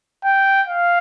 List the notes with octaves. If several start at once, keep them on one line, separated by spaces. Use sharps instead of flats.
G5
F5